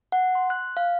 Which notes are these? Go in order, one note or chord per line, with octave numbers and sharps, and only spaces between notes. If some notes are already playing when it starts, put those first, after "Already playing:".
F#5
C6
F#6
F5